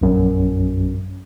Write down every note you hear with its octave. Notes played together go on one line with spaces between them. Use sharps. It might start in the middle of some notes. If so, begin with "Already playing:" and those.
A#1 F#2